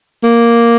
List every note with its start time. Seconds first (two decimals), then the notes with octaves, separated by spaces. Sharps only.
0.23 A#3